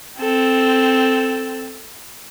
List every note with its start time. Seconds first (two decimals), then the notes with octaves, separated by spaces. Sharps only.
0.19 C4 A4